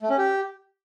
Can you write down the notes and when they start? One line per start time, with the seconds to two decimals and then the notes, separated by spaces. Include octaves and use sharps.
0.02 A3
0.10 C#4
0.18 G4